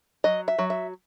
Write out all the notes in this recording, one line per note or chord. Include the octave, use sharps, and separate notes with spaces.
F#3 D#5
E5
F#3
E5